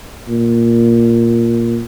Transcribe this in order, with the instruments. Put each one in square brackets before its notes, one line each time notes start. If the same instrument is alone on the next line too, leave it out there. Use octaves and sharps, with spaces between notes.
[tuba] A#2